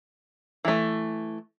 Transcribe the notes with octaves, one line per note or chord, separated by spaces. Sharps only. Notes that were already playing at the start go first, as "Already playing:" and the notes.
E3 A3